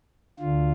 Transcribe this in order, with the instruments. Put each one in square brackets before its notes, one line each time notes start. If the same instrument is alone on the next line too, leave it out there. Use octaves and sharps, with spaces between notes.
[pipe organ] D2 D3 F4